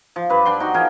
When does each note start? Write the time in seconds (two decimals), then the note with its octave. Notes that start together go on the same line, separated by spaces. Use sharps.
0.16 F3
0.29 G2 B4
0.45 D4 G5 C6
0.60 D#4 F#4
0.74 F3 G#4 A#4 G5